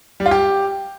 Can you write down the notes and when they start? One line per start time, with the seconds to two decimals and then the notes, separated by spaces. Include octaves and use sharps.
0.20 G3
0.26 F4
0.31 G4